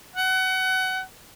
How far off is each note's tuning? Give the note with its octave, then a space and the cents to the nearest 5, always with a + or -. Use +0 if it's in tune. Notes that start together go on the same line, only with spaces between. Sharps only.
F#5 +25